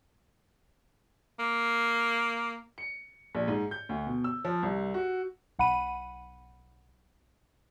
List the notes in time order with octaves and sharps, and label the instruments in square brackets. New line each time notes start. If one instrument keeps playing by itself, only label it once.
[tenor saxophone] A#3
[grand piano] C#7
A#1
G#2
G6
D2
B2
E6
F3
C2
F#4
[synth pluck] B1 F#5 B5 D#7